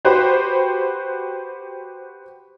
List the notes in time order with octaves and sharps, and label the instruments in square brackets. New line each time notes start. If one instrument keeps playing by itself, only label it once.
[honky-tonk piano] F#4 G4 B4 C5